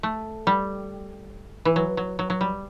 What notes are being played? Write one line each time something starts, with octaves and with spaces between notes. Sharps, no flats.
A3
G3
E3
F#3
F#3
F#3
F#3
G3